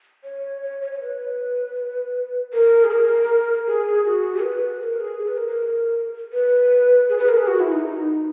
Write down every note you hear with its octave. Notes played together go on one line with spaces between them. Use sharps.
C#5
C#5
C#5
C#5
B4
A#4
G#4
A#4
G#4
F#4
B4
A#4
G#4
G#4
B4
A#4
A#4
B4
G#4
B4
A#4
G#4
F#4
E4
D#4
D#4